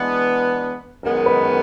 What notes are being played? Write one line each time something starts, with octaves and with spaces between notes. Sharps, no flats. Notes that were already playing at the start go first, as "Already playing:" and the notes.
Already playing: E3 G#3 B3 D4
F#2 D#3 G#3 B3 A#4
B4